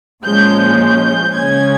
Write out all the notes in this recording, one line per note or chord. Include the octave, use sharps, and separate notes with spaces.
A#2 F3 G#3 C#4 G6
G6
C#3 G#3 C#4 G#6